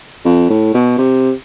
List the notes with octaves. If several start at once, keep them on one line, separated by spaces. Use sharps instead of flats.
F2
A2
B2
C3